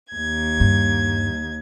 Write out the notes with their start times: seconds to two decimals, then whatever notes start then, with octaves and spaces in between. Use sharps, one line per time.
0.10 D#2 G#6
0.60 G2